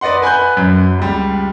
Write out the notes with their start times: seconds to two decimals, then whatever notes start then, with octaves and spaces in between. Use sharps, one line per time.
0.01 B4 D5 D#5 F#5 C6
0.22 B4 G#5 B5 F#6 G6
0.57 F#2
0.98 C#2 G3